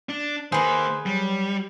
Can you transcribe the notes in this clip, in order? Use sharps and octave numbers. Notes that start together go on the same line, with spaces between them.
D4
D#3 A#3 G#4 B4 C5
F#3 G3